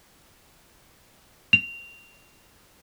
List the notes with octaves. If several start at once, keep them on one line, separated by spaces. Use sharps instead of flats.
F7